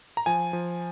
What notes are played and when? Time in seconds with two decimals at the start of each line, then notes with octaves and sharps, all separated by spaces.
0.17 A#5
0.26 F3 G#5
0.53 F3